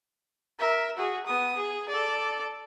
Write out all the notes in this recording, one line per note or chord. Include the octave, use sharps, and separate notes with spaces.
A#4 E5
F#4 G#4
B3 D#6
G#4
A4 D5